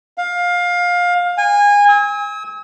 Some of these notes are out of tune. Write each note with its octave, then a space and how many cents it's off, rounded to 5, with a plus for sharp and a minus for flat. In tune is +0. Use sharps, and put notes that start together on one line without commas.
F5 +20
G#5 -25
E6 -45